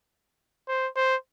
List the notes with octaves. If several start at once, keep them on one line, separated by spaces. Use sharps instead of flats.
C5
C5